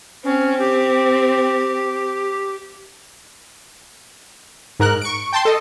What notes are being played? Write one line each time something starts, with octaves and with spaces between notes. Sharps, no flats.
C4 C#4
G4
G#2 A#4 F#6
C#6 D7
G5 A5 C6
A4 D#5